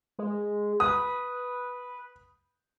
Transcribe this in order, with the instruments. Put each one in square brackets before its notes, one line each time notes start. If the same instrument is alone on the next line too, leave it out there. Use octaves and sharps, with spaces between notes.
[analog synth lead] G#3
[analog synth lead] B4 [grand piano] D#6